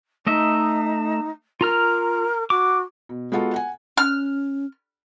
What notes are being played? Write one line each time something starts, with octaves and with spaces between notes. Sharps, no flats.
A3 D#4 D#5 E5
F4 A#4 A#5 F6
F#4 D6
B2
G#3 B3 F4 F#4 A4
F#5 G#5
C#4 F6